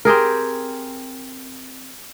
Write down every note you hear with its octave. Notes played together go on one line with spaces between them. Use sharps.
C4 G4 G#4 A#4